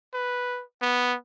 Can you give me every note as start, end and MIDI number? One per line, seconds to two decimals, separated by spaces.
0.14 0.63 71
0.82 1.16 59